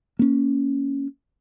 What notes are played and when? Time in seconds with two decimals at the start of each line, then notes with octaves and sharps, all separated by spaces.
0.19 A#3 C#4